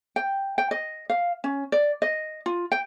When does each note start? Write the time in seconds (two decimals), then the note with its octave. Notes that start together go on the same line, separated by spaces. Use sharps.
0.16 G5
0.58 G5
0.71 D#5
1.10 F5
1.44 C#4
1.72 D5
2.02 D#5
2.46 F4
2.72 G5